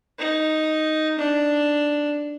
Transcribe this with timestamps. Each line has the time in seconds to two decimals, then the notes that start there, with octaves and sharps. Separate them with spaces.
0.19 D#4
1.18 D4